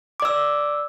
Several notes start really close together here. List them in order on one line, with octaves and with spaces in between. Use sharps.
D6 D5 E6